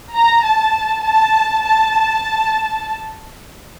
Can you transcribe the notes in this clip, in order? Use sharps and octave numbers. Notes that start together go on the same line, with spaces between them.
A#5
A5
A5
A5